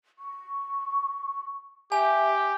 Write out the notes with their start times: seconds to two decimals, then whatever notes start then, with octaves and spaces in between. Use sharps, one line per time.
0.19 C#6
1.92 G4 E5 G#5